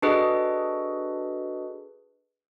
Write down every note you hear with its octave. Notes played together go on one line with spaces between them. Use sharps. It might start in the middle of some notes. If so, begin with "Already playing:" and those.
D4 F#4 G#4 A4 B4 D#5